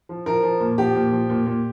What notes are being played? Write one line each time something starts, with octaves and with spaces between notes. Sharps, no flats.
F3
F3 A#4
F3
A#2
F3 G4
A#2
F3
A#2
A#2